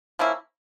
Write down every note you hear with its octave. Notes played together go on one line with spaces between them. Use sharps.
F3 A#3 C#4 E4